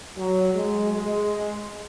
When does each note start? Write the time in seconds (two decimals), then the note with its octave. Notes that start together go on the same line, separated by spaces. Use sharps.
0.17 F#3
0.54 G#3
0.92 G#3